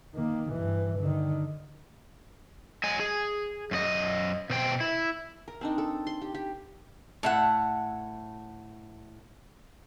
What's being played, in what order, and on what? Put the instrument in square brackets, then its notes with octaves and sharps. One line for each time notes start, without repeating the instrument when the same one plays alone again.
[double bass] D#3 A#3
G2 E3
D3 D#3
[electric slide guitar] F#3 D#5 G#5
G#4
F#2 F4 D#5
B2 C5 G5
E4
[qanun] A#4
C4 D4 D#4
A4
C6
G4
G4
[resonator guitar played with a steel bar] A2 E5 F#5